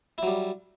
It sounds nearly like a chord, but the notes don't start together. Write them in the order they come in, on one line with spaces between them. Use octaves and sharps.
E4 F#3 G3